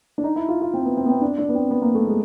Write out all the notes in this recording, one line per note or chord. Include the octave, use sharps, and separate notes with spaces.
D4
D#4
E4
F4
F4
C4
B3
C4
B3
C4
D4
D4
B3
C4
B3
A#3
A3
G#3